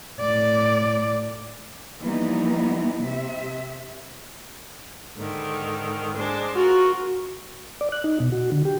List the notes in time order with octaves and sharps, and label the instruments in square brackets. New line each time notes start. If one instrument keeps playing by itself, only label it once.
[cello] A2 D5
[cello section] E3 F3 G3 A#3 B3 D#4
C3 E5
[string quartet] G#2 D3 D#3
G#3 D4 C5
[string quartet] F4 A#4 [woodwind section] F#4
[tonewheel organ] D5
F#6
D#4
B2
F#4
D3
G4